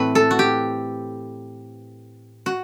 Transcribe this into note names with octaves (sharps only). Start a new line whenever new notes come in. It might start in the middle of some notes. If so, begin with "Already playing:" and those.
Already playing: A2 E3 A3 C4 B4
A4
F#4
G4
F#4